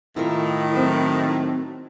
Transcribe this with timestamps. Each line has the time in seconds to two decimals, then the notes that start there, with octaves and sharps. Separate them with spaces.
0.16 A2 D#3 E4 F4 A#4
0.75 F#3 C4 F#4